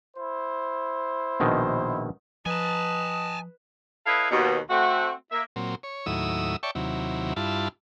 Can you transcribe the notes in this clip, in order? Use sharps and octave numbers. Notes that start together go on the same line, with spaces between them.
E4 C5
A#1 B2 D#3
F3 B4 D#5 G#5 A5
E4 A4 B4 C#5 D#5 F5
D#2 B2
A3 C4 F#4
A#3 E5
A#2 F#3 C4
C#5
D#2 A2 F#3 E4 D#6 E6
C#5 D5 E5 G5 A5 C#6
D#2 C3 F#3 E4
G2 E4 F4 A5